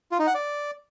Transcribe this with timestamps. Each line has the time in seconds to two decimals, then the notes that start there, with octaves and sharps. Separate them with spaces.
0.11 F4
0.19 D#4
0.27 F#5
0.35 D5